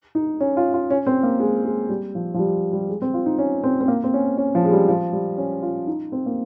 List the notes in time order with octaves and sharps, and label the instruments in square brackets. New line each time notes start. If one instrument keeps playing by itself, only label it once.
[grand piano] D#4
C#4
F4
F4
C#4
C4
A#3
G#3
G#3
G3
F3
F3
G3
G3
G#3
C4
F4
D#4
C#4
C4
C4
A#3
C4
C#4
C#4
F3
G#3
G3
F3
G3
C#4
F4
D#4
C4
A#3